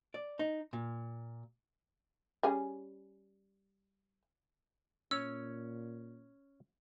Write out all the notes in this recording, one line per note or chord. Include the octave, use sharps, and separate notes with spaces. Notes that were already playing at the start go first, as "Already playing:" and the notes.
D5
D#4
A#2
G3 C#4 G#4
A#2 C#4 C#5 E6